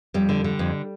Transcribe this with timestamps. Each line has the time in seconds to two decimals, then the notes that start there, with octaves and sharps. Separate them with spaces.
0.14 F2 G3
0.29 D3
0.44 D3
0.59 F2